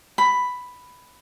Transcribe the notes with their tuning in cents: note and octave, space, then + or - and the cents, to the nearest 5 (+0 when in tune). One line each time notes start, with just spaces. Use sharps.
B5 +5